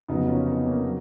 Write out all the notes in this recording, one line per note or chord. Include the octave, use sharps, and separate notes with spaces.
F1 F2 C#3 F#3 B3 D#4
C#4 F4
B3 D#4
A#3 C#4
F#3